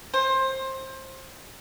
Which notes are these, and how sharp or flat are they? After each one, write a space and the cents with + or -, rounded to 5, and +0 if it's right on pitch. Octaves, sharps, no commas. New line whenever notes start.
C5 +20